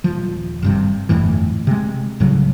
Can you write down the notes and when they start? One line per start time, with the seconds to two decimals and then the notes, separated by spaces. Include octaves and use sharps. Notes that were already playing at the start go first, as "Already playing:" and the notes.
0.04 D#1 F3
0.62 G#1 G2 C3
1.09 G1 F2 A2 E3
1.67 C3 G#3
2.20 C2 A2 C#3 F#3